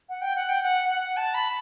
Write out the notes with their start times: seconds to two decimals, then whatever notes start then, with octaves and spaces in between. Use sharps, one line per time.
0.09 F#5
0.21 G5
0.36 F#5
0.49 G5
0.62 F#5
0.89 F#5
1.17 A5
1.34 B5